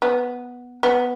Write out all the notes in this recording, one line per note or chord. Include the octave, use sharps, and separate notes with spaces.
B3
B3